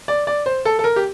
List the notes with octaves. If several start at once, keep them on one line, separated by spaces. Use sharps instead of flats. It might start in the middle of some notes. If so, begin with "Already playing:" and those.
D5
D5
C5
A4
A4
A#4
G4